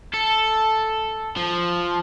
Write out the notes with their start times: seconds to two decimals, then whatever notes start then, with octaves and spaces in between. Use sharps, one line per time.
0.14 A4
1.37 F3